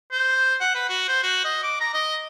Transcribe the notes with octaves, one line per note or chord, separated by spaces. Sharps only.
C5
F#5
B4
F#4
C5
F#4
D#5
D6
A#5
D#5